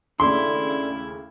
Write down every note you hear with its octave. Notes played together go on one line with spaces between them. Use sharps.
D#2 C#3 A3 D4 E4 A4 D5 C6